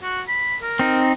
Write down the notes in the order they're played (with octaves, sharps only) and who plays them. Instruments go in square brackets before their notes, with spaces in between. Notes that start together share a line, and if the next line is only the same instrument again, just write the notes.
[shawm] F#4
B5
A#4
[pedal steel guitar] C4 D#4